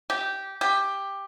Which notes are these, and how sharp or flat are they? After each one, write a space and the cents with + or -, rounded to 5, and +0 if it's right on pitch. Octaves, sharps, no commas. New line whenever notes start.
G4 -10
G4 +10